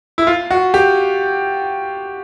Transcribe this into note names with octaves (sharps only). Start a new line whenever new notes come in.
E4
F4
F#4
G4